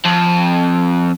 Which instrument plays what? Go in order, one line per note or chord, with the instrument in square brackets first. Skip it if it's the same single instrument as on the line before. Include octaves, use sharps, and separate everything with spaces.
[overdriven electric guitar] F2